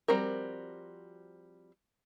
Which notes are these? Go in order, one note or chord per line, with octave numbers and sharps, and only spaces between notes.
F3 G3 C4 F#4 A#4